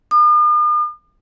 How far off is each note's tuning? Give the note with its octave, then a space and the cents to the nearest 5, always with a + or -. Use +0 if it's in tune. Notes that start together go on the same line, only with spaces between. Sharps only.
D#6 -45